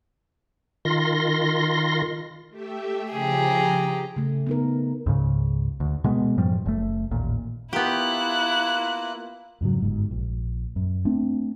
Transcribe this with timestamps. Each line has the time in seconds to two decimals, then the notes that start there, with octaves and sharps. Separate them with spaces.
0.85 D#3 F4 C6 A#6
2.49 A3 G4 E5
3.10 C#3 F3 G4 G#4 A#5
4.16 C#3 A3
4.47 B3 D#4 A#4
5.06 C#2 G#2 C#3
5.80 D2
6.04 B2 G#3 B3
6.37 F#2 A2 F3 G3
6.66 F#1 A3
7.11 A1 D#2 A#2
7.73 A#3 B3 E4 F4 G4 F#6
9.61 F2 G#2 C#3 F#3
9.82 G1 G#2
10.11 A#1
10.76 F#2
11.05 A3 C4 D4